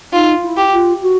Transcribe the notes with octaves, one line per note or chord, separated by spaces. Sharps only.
D#4 F4
E4
G4
F4
F#4